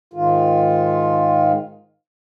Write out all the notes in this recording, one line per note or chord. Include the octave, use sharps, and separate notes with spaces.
G#2 D#3 F4